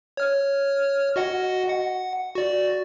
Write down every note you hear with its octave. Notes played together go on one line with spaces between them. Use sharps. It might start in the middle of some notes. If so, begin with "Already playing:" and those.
C#5 F6
F#4 D#5 F#5
F#5
F#4 D5